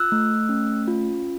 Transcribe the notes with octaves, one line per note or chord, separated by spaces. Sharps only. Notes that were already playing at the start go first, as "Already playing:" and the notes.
Already playing: F4 E6 F#6
A3
C#4
F4